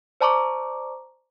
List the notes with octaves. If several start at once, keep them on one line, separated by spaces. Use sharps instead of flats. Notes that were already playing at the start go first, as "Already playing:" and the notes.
C5 D5 A5 A#5 C#6 D6